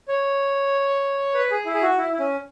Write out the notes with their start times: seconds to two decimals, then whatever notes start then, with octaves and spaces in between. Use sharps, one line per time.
0.08 C#5
1.34 B4
1.51 G#4
1.66 E4
1.74 G#4
1.82 F#4
1.98 E4
2.13 E4
2.19 C#4